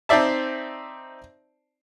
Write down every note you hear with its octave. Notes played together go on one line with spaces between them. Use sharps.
C4 D#4 C5 D5 E5 A5